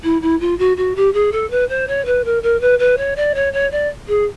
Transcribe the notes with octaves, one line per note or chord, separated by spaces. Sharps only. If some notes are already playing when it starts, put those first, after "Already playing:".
E4
E4
F4
F#4
F#4
G4
G#4
A4
B4
C5
C#5
B4
A#4
A#4
B4
B4
C#5
D5
C#5
C#5
D5
G#4